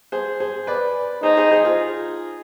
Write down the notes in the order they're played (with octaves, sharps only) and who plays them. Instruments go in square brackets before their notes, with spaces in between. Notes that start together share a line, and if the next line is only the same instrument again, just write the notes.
[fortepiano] G#4 C5
G#4 C5
B4 D5
[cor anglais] D#4 [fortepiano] G#4 C5
[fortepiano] G#4 C5
G#4 C5
F4 G#4